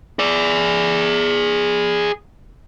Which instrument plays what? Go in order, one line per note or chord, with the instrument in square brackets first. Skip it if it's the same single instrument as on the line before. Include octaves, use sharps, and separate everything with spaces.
[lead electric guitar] G#4 D5